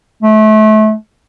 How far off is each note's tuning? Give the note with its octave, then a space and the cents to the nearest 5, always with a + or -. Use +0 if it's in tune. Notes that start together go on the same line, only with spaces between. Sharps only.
A3 -30